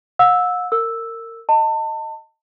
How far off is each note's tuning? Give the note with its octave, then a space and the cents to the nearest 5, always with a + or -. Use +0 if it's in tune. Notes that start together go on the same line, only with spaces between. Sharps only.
F#5 -45 E6 -5
A#4 -30 E6 +0
D#5 +0 A5 +30